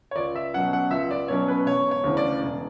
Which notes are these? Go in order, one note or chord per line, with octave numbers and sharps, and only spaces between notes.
C#5
C#2 D5
E5
B2 F#3 C#4 F#5
F#5
C#2 E5
D5
B2 F#3 C#4 C#5
B4
E1 C#5
C#5
D2 C#3 E3
D5
E1